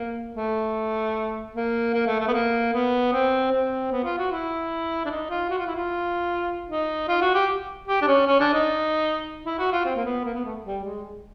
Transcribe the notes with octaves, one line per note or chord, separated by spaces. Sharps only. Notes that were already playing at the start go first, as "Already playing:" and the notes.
Already playing: A#3
A3
A#3
A#3
A3
A3
B3
A#3
B3
C4
C4
B3
F4
F#4
E4
D4
D#4
F4
F#4
F4
E4
F4
D#4
F4
F#4
G4
G4
D4
C#4
C#4
D4
D#4
E4
F#4
F4
C4
A#3
B3
A#3
B3
A3
G3
G#3